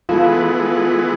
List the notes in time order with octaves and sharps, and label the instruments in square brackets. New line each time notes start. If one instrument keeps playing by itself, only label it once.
[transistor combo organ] E3 G#3 B3 [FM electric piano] F4 A4